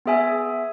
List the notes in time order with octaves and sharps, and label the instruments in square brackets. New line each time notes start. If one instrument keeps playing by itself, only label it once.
[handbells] B3 G#4 E5 G#5